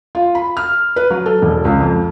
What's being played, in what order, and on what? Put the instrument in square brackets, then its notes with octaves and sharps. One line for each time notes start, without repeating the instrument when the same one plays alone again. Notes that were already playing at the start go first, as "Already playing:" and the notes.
[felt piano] F4
B5
F6
B4
F#3
A4
E1
C#2
F2